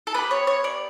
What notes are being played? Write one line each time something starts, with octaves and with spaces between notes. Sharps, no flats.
A4
B3 D4 G4 B4
C#5
C#5
D5